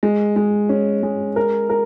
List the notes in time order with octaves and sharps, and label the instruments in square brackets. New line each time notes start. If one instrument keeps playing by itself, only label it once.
[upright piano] G#3
G#3
C#4
G#3
A#4
A#4